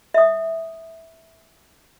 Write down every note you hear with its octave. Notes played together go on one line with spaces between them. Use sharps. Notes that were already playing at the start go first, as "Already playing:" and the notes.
E5 D#6